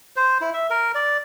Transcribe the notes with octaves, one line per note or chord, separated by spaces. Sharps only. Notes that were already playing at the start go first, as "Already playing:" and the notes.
C5
E4
E5
A#4
D5